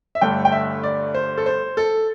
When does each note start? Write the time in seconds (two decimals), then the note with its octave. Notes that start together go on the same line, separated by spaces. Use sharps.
0.15 E5
0.21 G1 G2 D3 A3 G5
0.45 G5
0.52 E5
0.83 D5
1.14 C5
1.38 A4
1.46 C5
1.77 A4